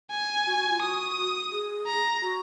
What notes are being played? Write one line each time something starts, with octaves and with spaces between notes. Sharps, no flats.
G#5
F#4
F#4
F4
F#4 D#6
G#4
A#5
F#4